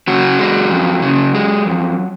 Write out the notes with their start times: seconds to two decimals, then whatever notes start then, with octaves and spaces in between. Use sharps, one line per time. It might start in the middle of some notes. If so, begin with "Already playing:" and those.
0.08 C#3 F#3 F#4
0.39 G#3
0.71 F2
1.02 C#3
1.35 G#3
1.66 F2